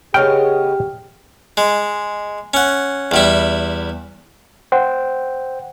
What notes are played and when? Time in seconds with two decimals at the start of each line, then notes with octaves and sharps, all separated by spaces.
0.14 C#3 G#3 B3 G4 G#4 C#5 G5 F6
1.57 G#3
2.54 C#4 F#5
3.11 E2 G3 E4
4.72 C5 F#5 G5